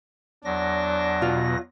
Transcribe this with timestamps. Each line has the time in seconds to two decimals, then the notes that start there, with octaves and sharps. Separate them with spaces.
0.45 E2 F#3 D4 A#6
1.22 B2 F4